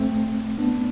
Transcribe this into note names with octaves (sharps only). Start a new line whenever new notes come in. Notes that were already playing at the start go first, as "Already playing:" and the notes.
Already playing: A3 C4
B3 D4